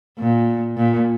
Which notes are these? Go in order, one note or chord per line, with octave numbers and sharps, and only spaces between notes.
A#2
A#2